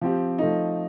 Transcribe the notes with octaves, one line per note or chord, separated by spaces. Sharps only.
F3 C4 G4
F3 A3 D#4